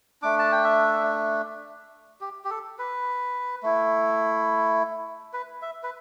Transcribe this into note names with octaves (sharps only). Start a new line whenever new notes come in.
A3 D4 D6
A5
G5
E5
G4
G4
A4
B4
A3 E4
B4
E5
B4